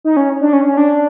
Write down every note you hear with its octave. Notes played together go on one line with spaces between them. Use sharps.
D#4
C#4
D4
C#4
C#4
D4